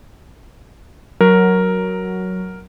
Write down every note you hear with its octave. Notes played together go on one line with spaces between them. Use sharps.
F#3 A#4